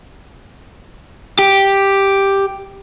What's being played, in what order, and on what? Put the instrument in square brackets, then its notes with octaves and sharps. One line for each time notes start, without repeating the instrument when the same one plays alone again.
[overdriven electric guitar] G4